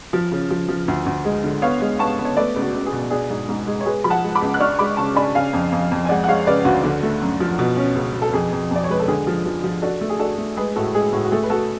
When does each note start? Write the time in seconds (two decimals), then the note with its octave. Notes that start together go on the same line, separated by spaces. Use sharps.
0.13 F3
0.32 C#3
0.50 F3
0.68 F3
0.88 D2
1.06 D2
1.24 G#3
1.44 D3
1.62 B3 C#5 F5
1.81 G#3
1.99 B3 A5 C#6
2.19 B3
2.25 C#5
2.36 A3 B4 D5
2.56 C#2
2.62 F#4
2.74 C#2
2.86 G#4
2.92 B2
3.11 D4 G#4
3.30 G#2
3.49 G#2
3.67 G#3
3.81 C#5
3.85 G#3 G#4 B4
4.04 F3 B5
4.10 F#5 A5
4.23 G#3
4.35 B5 D6
4.42 C#2
4.54 F#6
4.60 D4 C#6 F6
4.79 G#3 B5 D6
4.97 C#3 A5 C#6
5.16 D4 G#5 B5
5.35 C#3 F5 G#5
5.53 F2
5.72 F2
5.91 F2
6.05 G#5
6.09 G#3 D5 F#5
6.24 F#5
6.28 G#3 C#5 F5
6.47 C#3 B4 D5
6.65 D2 F#4
6.84 D3
7.03 A3
7.22 F#2
7.40 F3
7.59 B2
7.77 C#4
7.95 C#2
8.14 B2
8.22 A4
8.33 F2 G#4
8.52 F2
8.71 F2 D5
8.84 C#5
8.89 G#3 B4
9.00 A4
9.08 D3 G#4
9.27 F3
9.45 F3
9.64 F3
9.82 D4 F#4 A4
10.01 A3
10.09 G#4
10.19 D4 F#4 A4
10.38 A3
10.57 G#3 G#4 B4
10.76 A2 F#4 A4
10.95 G#3 G#4
11.12 A2 F#4
11.24 F#4
11.31 A3 G#4
11.43 B4
11.50 A3 F#4 A4